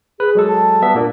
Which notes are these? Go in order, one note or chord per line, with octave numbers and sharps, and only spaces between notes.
G#4 B4
F#3 G#3 A4
A5
G3 B3 E5
A#2 A#3 D4